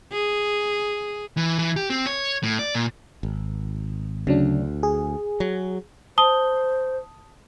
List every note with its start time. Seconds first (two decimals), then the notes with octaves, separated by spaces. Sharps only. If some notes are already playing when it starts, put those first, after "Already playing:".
0.13 G#4
1.37 E3
1.59 E3
1.76 G4
1.90 C4
2.06 C#5
2.43 A2
2.59 D5
2.75 A#2
3.23 G#1
4.27 D2 C#3 F#3 D4
4.83 G#4
5.40 F#3
6.18 C5 A5 D#6 G7